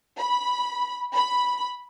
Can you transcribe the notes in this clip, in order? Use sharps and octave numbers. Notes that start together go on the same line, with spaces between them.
B5
B5